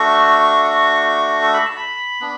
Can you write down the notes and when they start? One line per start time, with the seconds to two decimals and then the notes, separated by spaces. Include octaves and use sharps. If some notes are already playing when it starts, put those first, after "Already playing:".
Already playing: A3 D4 F#4 C#6
0.65 C#6
1.43 C#6
1.54 B5
1.65 A5
1.77 B5
2.21 B3 D4